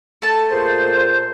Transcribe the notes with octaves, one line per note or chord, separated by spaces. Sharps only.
A3 A5
A#2 G#4 C5